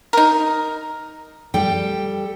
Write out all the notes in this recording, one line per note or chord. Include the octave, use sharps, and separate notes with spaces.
D#4 A#4
G3 A4 G5